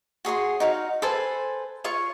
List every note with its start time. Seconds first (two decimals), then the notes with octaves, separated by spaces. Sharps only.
0.25 F#4 G#4 C#5 C6
0.60 D#4 F#4 F5
1.02 A4 B4 C5 G#5
1.84 F4 C#5 C#6